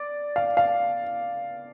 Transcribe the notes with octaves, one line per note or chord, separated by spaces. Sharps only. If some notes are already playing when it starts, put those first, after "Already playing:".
Already playing: D5
F5
F5